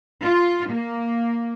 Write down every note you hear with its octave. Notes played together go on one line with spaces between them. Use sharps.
F4
A#3